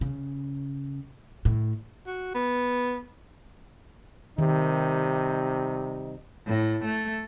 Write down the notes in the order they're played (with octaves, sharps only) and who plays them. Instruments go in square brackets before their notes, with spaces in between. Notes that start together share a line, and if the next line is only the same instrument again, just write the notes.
[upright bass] C#3
A2
[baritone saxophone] F#4
B3
[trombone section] C3 G3 D#4 [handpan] D#3
[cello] A2
A3